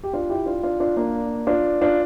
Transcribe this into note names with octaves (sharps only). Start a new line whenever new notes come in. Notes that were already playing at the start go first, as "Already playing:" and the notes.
G4
D4 F4
E4 G4
D4 F4
D4 F4
D4 F4
A#3 D4
D4 F4
D4 F4